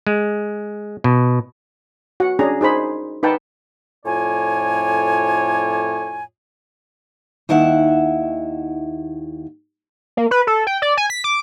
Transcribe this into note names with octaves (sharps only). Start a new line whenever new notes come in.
G#3
B2
F#4 F#5
C#4 D4 G#4 A#5
D#4 G#4 C5 B5
D#4 B4 F#5 G5 A5
F2 A2 F4 C#5 D5 G#5
D#2 D#3 E4 E5 F#5
A#3
B4
A4
G5
D5
G#5
B6
D6